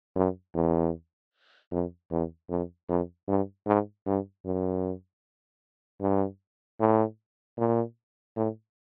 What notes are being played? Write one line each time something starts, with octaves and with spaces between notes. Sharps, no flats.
F#2
E2
F2
E2
F2
F2
G2
G#2
G2
F#2
G2
A2
A#2
A2